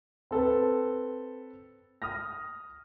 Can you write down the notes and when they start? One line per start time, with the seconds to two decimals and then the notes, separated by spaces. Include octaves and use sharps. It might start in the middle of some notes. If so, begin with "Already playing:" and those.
0.31 C4 A4 B4
2.02 D#6 F6 A#6